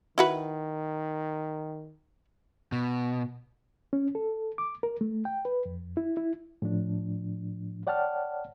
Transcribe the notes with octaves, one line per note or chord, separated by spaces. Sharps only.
D#3 E4 F#4 B4
B2
C#4
A4
D6
A#4
A3
G5
B4
F2
E4
E4
A2 F3 D4
C#5 D5 F#5 G5 A5 F6